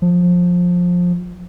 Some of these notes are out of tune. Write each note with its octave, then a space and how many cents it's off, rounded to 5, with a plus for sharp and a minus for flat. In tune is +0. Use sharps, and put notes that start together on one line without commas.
F3 +20